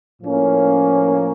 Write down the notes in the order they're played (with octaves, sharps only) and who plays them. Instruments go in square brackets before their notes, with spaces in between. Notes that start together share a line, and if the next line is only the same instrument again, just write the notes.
[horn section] A2 F3 A#3 C#4